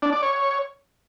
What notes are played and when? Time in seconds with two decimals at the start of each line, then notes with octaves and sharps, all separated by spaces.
0.02 D4
0.12 D5
0.23 C#5